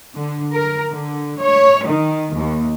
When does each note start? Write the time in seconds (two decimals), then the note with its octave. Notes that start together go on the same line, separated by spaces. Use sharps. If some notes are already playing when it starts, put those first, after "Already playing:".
0.14 D3
0.54 A#4
0.93 D3
1.41 C#5
1.88 D#3
2.37 D#2